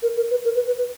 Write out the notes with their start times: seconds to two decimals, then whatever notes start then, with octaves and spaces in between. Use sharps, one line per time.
0.03 A#4
0.17 A#4
0.31 B4
0.45 A#4
0.56 B4
0.67 B4
0.78 B4